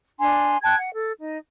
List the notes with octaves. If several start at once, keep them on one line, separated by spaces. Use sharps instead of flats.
D4 G#5 C6
G5 A5 F#6 G#6
F#5
A4
D#4